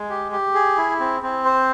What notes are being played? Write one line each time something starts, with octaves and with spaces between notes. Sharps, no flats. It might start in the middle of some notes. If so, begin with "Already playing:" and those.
Already playing: G#3
G4
G4
G#4
E4
C4
C4
C5